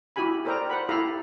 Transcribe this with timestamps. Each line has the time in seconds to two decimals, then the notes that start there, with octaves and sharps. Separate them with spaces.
0.16 E4 F#4 G4 G#5 B5
0.45 A4 A#4 C5 D5 G5 A#5
0.70 C5 F#5 B5
0.89 E4 G4 A4 F5 A#5 B5